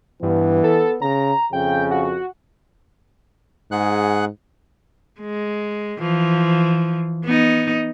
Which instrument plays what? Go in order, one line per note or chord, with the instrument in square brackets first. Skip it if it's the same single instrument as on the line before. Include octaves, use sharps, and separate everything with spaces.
[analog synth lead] G2 [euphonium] E3 [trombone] B3
[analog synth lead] A4
[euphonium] C#3 [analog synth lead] A#5
[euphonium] F2 [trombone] C#3 [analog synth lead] G5
[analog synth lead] F#4
[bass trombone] G#2 [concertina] G#4 F#5 F#6
[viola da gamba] G#3
E3 F3
B3 D#4